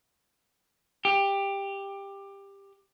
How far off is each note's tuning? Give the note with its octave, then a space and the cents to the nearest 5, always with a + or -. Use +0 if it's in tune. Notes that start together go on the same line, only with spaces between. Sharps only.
G4 +15